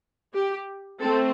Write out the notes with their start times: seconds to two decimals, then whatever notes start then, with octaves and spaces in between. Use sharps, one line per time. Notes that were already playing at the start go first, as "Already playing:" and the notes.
0.34 G4
1.00 A3 C4 A4